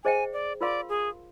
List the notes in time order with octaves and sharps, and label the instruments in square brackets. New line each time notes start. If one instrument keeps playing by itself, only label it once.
[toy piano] G#4 C5 D#5 G5 [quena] G#5
[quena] D5
[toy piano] F4 A#4 F5 C6 [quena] D5
[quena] G#4